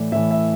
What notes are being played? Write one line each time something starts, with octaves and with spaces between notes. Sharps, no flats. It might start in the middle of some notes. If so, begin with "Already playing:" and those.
Already playing: A2 E3 D5
A2 E3 E5
E5